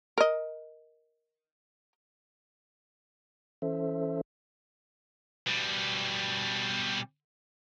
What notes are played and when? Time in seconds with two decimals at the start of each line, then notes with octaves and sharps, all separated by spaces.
0.18 A#4 D#5
3.62 E3 C#4 A4 C5 E5
5.47 B2 G3